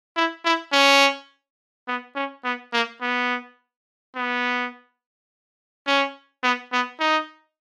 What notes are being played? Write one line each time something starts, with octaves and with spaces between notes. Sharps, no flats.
E4
E4
C#4
B3
C#4
B3
A#3
B3
B3
C#4
B3
B3
D#4